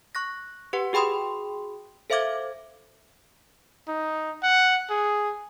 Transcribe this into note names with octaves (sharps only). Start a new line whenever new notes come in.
C#6 F#6 A#6
G4 B4 F#5
F#4 G#4 G5 B5 C6 D#6
A4 C5 E5 F5 D6 G#6
D#4
F#5
G#4